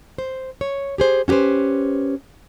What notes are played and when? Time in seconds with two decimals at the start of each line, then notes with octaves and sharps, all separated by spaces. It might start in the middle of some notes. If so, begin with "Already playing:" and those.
0.18 C5
0.61 C#5
0.98 G4 G#4 C5
1.28 C#4 F#4 G4 B4 C5